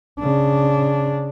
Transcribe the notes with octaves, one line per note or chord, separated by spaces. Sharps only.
C#3 D4